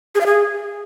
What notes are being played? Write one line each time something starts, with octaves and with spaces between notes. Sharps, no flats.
G#4
F5
G#4